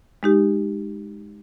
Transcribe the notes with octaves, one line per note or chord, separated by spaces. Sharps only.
G#3 D#4 G4